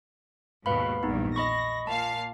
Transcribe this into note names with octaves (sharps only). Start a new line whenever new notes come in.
D#2 G#2 B2 B4 F5 B5
A#1 E2 G2 B3 D#4
D#5 B5 C#6 A#6
A#2 F5 A5